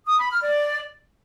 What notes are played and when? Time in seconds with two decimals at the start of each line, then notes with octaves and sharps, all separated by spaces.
0.06 D#6
0.18 B5
0.29 F6
0.41 D5